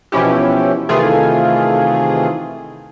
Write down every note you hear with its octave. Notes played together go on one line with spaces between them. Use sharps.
B2 E3 F3 C#4 E4 G4
C3 D#3 E3 A3 F4 G#4